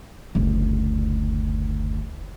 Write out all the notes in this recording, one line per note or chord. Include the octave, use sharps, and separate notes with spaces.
F#1 D2